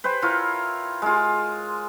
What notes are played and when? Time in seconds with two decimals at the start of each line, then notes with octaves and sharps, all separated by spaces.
0.04 B4 C5 G5
0.22 E4 F4 A#4 C#5
1.02 G#3 F4